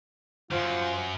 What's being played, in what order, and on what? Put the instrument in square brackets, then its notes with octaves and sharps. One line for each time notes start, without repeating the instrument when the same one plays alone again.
[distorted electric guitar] F#2 F#3 [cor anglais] F4 [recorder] C5